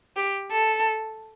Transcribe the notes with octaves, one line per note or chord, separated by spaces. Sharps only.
G4
A4